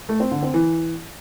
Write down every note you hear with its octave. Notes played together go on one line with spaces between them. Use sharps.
A3
C4
D3
C4
E3